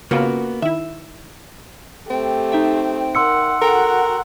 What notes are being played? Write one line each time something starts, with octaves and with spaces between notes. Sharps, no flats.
C#3 A#3 B3 F4 F#4
D#3 E4 E5
A3 C4 G4
D#4 E5 G5
A#4 F#5 C6 E6 C#7
F#4 A4 A#4 F#5 G5 A#5